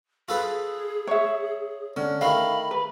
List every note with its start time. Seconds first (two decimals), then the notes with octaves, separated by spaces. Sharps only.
0.29 F4 G#4 A4 B4
1.07 C#5 E5
1.97 D3 C#4
2.21 D#3 A3 F5 B5
2.71 B4